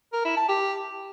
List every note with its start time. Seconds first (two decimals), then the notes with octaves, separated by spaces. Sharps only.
0.13 A#4
0.25 E4
0.37 A5
0.48 G4